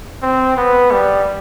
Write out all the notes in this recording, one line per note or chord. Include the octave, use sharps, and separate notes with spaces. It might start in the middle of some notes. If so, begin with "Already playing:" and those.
C4
B3
G3